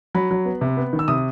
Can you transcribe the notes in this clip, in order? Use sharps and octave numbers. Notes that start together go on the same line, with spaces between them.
F#3 B5
F#3
B3
C3
B3
D#3
E6
C3 D#6